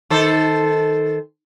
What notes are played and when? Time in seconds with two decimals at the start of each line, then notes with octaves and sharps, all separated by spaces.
0.10 D#3 A4 C5